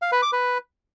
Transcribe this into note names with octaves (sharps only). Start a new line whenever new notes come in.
F5
B4
D6
B4